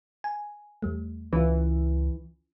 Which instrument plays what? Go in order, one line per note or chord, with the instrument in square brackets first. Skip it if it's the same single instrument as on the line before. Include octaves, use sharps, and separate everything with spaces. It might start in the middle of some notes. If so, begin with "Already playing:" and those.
[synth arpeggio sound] G#5
E2 G3 A3
[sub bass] C#2 [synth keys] E3 [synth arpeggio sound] C#4 F4